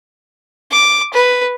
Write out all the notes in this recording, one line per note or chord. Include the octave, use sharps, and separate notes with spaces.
D6
B4